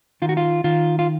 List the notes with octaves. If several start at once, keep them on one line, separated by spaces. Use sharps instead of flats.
D#3 F4
F#4
F4
D#3 F4
F4